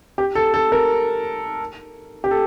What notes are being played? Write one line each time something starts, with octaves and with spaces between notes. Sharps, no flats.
G4
A4
A4
A#4
G4
A4